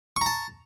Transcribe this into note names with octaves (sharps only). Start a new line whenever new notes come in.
A5 A#5 C#6